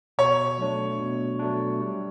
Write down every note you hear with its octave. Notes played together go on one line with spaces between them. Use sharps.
B2 C#5
F#3 A3 D4
B2
F#3 A3 D4
G3